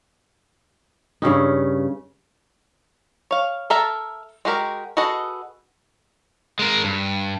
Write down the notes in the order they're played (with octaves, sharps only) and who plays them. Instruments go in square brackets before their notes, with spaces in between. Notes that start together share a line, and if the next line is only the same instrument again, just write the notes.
[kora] G2 C#3 C#4 D#4
[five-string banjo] C#5 F5
A4 A#4 E5 A5 A#5
G#3 F#4 G4 A#4
F#4 G#4 A4 B4 D#5
[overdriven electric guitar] G#3 A#4
G2